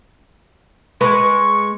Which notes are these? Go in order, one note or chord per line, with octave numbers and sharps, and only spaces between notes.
G#3 B4 C#6